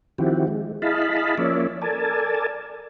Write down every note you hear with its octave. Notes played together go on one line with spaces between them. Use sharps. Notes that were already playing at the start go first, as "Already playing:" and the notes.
D#3 F3 C4 E4 F#4 G4
G#3
E4 G#4 D#5 F5 A5 B5
F3 A#3 C#4 C#5 D5 E5
A4 A#4 D5 G#5 A5